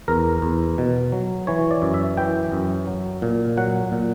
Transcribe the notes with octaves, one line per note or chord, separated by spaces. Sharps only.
E2 A#4
E2
B2
F#3
E3 C#5
D5
F#2
E5
E3 G5
F#2
F#3
A#2
F#3 F#5
A#2